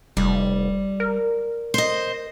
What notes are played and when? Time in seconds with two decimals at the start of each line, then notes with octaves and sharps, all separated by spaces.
0.17 F1 G3
1.00 A#4
1.74 C5 D#5